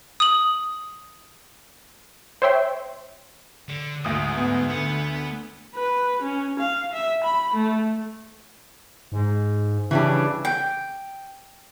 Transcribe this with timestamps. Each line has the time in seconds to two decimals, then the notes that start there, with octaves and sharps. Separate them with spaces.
0.20 D#6 F#7
2.42 C5 C#5 E5 G5 C6
3.68 D3
4.04 D2 G#2 D#6 D7
4.36 B3
4.69 D3 B3 F#5
5.76 B4
6.23 C#4
6.60 F5
6.93 E5
7.25 B5
7.55 A3
9.12 G#2
9.91 C#3 E3 G3 D4
10.45 G5